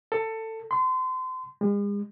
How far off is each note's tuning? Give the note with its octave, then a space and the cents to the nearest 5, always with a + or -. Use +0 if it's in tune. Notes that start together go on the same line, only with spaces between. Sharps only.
A4 +20
C6 -30
G#3 -40